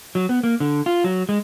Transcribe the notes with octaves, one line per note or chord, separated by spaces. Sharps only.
F#3
B3
A#3
D3
F4
F#3
G#3